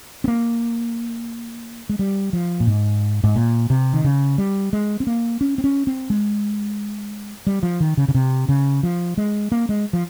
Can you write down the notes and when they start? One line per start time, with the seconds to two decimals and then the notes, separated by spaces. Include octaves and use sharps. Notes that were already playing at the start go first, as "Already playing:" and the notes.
0.24 C4
0.28 A#3
1.89 G#3
1.99 G3
2.33 F3
2.60 A#2
2.67 G#2
3.24 G#2
3.36 A#2
3.70 C3
3.93 D#3
4.04 C#3
4.38 G3
4.73 G#3
5.00 C4
5.07 A#3
5.41 C#4
5.58 C4
5.64 C#4
5.87 C4
6.10 G#3
7.47 G3
7.63 F3
7.80 D#3
7.97 C#3
8.08 C#3
8.15 C3
8.49 C#3
8.83 F3
9.18 G#3
9.52 A#3
9.69 G#3
9.93 F3